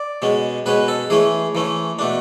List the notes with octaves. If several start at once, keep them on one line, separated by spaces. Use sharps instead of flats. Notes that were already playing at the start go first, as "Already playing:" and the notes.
Already playing: D5
B2 G#3 C#4
B2 G#3 C#4 B4
A4
E3 A3 C#4 G#4
E3 A3 C#4
B2 A3 D4